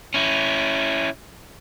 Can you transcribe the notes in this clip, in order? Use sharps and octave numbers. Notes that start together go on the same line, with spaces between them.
C#4 E4